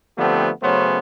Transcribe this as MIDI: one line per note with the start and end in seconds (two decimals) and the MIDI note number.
0.18 0.50 50
0.18 0.50 53
0.18 0.50 57
0.18 0.50 59
0.18 0.50 60
0.18 0.50 67
0.63 0.99 49
0.63 0.99 54
0.63 0.99 57
0.63 0.99 59
0.63 0.99 61
0.63 0.99 72